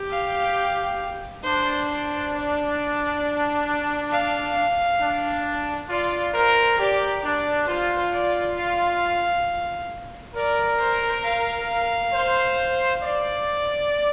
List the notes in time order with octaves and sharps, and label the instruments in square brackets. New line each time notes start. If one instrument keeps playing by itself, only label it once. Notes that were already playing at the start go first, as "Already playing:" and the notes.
Already playing: [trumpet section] G4
[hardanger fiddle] F5
[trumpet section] D4 [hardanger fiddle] C5
[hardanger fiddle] C5
D5
F5
[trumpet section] D4
[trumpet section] F4 [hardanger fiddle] D5
[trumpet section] A#4 [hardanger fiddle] C5
[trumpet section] G4 [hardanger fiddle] D5
[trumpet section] D4 [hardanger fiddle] D5
[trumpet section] F4 [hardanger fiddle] C5
[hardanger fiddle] D5
F5
[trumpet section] A#4 [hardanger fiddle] D5
[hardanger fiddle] C5
F5
[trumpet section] C5
D5